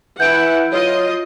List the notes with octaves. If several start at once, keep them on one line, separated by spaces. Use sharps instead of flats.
E3 E4 F#5 G6 D7
F#3 F4 D#5